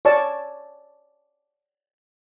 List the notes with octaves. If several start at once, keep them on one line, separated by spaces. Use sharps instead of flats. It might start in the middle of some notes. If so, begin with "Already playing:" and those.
C#5 D5 A5